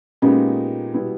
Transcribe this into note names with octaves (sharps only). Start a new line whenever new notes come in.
A#2 G#3 B3 C#4 D#4 G4
B2 G3 B3 E4